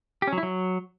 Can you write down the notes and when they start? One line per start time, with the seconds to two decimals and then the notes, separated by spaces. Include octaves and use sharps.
0.22 G4
0.27 C#4
0.33 F#3
0.38 E4
0.43 F#3